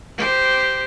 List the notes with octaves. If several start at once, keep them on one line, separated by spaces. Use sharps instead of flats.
G4 C5